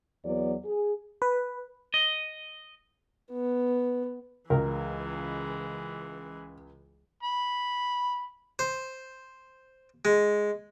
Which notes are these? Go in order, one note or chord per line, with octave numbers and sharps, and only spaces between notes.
E2 F#3 B3 D5
G#4
B4
D#5
B3
C#2 E3 G#3 A#4
B5
C5
G#3